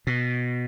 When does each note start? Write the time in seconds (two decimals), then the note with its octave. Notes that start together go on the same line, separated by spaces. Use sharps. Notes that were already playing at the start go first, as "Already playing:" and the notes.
0.07 B2